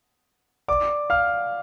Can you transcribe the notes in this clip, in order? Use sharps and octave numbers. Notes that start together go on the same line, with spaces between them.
D5 D6
F5 F6